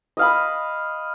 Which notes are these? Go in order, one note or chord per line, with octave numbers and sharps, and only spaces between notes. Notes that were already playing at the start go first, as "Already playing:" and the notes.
D#5 F5 B5